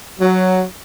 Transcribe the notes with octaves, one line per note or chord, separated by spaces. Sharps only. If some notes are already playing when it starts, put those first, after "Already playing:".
F#3